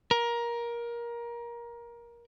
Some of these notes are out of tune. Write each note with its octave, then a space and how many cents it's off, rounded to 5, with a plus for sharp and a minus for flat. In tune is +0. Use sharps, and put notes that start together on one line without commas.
A#4 +20